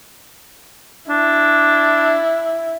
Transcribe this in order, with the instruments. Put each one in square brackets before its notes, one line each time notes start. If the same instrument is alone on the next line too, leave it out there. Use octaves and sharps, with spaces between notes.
[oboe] D4 [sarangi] E4